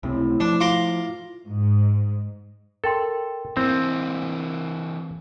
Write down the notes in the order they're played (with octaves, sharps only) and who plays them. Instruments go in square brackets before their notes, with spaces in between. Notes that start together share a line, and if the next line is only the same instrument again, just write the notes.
[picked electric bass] C#2 C3 C4 [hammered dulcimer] A2
[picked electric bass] F3 [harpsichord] D4
[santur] F4 [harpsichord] A#5 C6 D6
[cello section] G#2
[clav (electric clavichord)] A4 [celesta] A#4 G5 C6
[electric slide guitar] E3 A#3 [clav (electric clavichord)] C4